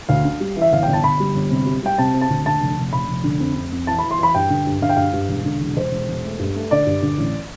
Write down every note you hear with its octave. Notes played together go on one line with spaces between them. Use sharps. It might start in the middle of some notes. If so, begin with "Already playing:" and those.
D2 F5
D4
G3
E3
E5
G1 F5
G1 G5
A5
G1 B5
G3
G1
C3
G3
G3 G5
C3 A5
C4
A5
D2
D3 A5
F1
F1
F1 B5
F1
D3
F2
F2
F2
E3 A5
B5
E3
C6
E3 B5
G2 G5
D3
G2
D3 F5
G5
G2 F5
G2
E1
D3
E1
E1 C5
E1
E1
A3
G2
A3
D3 D5
G2
D3
A1